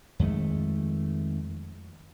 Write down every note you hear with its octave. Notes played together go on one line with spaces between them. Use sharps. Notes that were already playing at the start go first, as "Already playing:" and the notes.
F2 D#3 G#3 A3